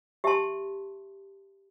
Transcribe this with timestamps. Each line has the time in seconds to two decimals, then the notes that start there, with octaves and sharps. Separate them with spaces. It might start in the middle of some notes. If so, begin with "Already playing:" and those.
0.24 G4 E5 A5 C6